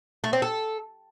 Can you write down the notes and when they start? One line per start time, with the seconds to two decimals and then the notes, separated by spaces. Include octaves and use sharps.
0.24 A3
0.33 C4
0.42 A4